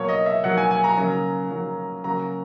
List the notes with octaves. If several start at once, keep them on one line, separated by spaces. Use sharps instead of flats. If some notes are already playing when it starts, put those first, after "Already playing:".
Already playing: B2 F#3 A#3 C#5
D#5
E5
B2 F#3 A#3 F#5
G#5
G#5
A#5
C#3 F#3 A#3
C#3 F#3 A#3
C#3 F#3 A#3 A#5